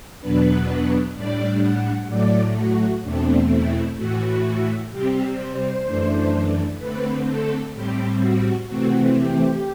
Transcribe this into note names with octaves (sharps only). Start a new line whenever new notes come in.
E2 B2 F#3 B3 D4 B4
A2 G3 D4 D5
F#5
A2 F#3 A3 D5
F#4
E2 B2 A3 C4 D4
E4
A2 E3 A3 F#4
C3 G3 C4 G4
C5
F#2 E3 A3 D4
D3 A3 C4 B4
A4
A2 G3 C4 G4
F#4
C3 E3 A3 C4 F#4
G4